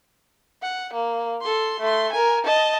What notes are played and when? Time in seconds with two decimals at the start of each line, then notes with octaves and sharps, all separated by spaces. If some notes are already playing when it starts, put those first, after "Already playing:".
0.62 F#5
0.93 A#3
1.42 A4 C6
1.80 A3 C6
2.13 A#4 G#5
2.44 D#5 A5